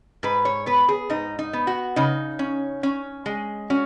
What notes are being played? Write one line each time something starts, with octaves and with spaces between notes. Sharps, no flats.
G#2 B4
C#5
B3 B4
G#4
G#2 D#4
D#4
B3
F#4
C#3 D#4
C#4
C#4
G#3
C#4 F#4